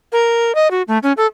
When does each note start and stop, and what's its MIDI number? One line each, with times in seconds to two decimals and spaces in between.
0.12 0.55 70
0.55 0.70 75
0.71 0.82 66
0.88 0.98 57
1.03 1.13 61
1.17 1.27 69